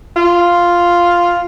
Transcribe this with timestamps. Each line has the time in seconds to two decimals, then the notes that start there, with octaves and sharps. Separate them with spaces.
0.16 F4